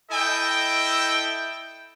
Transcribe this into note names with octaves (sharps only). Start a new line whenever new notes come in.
E4 A4 D#5 G5